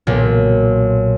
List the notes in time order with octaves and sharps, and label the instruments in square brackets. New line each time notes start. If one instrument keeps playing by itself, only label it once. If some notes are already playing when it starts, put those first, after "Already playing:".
[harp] B1 A#2